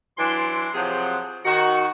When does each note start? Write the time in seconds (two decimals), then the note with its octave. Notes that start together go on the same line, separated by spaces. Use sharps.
0.18 E3 F#3 D4 C6
0.74 C3 F3 F#3 G#4 F#5 G5
1.45 D#3 F#4